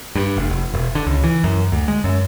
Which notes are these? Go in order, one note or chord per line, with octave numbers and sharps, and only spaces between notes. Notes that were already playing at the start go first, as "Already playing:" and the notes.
G2
F1
F1
E1
D3
C#2
E3
F#2
D2
G#3
F#2